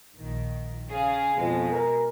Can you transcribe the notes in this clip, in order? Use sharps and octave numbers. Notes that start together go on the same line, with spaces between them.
A#1 D#3
C#3 G#4 F5
F2 B2 G#3
A#4